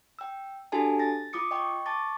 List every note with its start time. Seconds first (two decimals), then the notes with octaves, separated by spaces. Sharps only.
0.19 G5 E6
0.72 D4 F#4 G4 A4 G#5 A5
0.99 A6 A#6
1.33 F4 D6 D#6 C#7
1.51 D#5 G5 C#6
1.86 A5 C#6 D6 A6